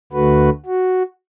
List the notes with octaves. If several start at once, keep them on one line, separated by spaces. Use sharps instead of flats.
D2 D3 A3 F#4 B4
F#4